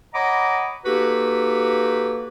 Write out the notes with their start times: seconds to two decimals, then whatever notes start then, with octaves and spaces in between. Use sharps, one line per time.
0.14 C#5 D#5 F#5 A#5 B5 D6
0.86 A#3 D#4 F#4 G4 A4 B4